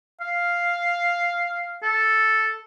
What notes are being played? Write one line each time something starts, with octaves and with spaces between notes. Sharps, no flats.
F5
A4